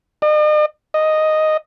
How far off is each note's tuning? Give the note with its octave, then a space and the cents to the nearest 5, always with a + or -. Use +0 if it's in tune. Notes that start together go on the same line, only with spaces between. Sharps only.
D#5 -45
D#5 +0